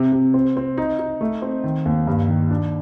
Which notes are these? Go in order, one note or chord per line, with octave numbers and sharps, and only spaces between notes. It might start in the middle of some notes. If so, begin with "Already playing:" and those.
Already playing: C3
C3
C4
C4
D#4
D#4
A3
C4
D#3
D#2
G2
D#3
D4